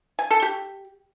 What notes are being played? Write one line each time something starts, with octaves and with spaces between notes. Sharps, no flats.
G#5
A4
G4